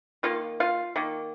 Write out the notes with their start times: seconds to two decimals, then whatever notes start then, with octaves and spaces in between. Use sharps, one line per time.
0.23 D#3 A#3 F4 F5
0.60 F4 F5
0.96 D#3 A#3